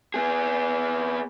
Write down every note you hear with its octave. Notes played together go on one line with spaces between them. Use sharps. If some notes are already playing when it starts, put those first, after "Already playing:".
B3 G#4